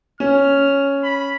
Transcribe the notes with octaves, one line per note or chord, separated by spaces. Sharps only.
C#4 F6
B5